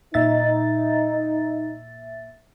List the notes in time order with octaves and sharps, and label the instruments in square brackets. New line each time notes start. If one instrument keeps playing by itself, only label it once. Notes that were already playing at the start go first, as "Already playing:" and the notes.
[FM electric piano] A#2 E5 A6 [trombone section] D#4